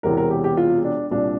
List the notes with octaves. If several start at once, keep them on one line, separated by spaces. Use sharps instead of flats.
E1 E2 C3 E3 A#4
A#4
G4
G4
F4
D4
C2 A#2 D4